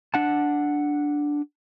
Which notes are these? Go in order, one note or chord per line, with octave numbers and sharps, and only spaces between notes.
D4 F#5 A5